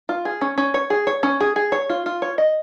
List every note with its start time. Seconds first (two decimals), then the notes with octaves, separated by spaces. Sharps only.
0.09 F4
0.25 G#4
0.41 C#4
0.58 C#4
0.74 C#5
0.90 G#4
1.07 C#5
1.23 C#4
1.40 G#4
1.56 G#4
1.72 C#5
1.89 F4
2.06 F4
2.22 C#5
2.38 D#5